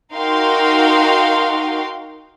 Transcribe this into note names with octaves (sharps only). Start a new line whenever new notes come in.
D#4 F#4 A#4 F5 G5 C6